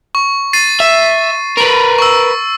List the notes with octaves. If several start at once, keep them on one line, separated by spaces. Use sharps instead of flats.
C#6
A6 C7 D#7
E5
A#4 B4
C#6 E6